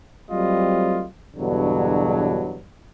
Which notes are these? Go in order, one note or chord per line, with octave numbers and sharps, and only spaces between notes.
F#3 G3 A3 C4 F4 D#5
E2 G2 B2 D3 F#3